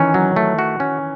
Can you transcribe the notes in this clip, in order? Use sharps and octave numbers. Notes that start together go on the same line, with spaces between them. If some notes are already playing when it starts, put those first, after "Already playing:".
Already playing: D#3 E3 C#4
F#3
A3
F#4
C#4